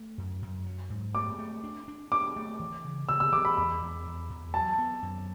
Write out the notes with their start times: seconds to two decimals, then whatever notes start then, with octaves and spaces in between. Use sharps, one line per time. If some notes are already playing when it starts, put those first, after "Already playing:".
Already playing: A3
0.18 F#2
0.42 F#2
0.66 F#3
0.90 G#2
1.15 A3 D6
1.39 A3
1.64 D4
1.88 D4
2.12 D4 D6
2.36 A3
2.59 E3
2.85 C#3
3.09 C#3 E6
3.20 E6
3.32 E3 D6
3.45 B5
3.57 E2 B5
3.81 E2
4.05 E2
4.30 E2
4.54 F#3 A5
4.78 B3
5.03 F#2